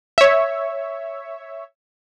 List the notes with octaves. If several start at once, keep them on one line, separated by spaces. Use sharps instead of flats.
C#5 E5